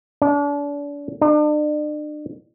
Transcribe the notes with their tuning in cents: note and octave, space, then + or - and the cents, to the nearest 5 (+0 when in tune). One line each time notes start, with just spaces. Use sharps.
D4 -35
D4 +40